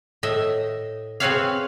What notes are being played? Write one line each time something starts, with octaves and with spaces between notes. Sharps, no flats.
A2 D#5 E5
C4 G#4 B4 C#5 E5 F5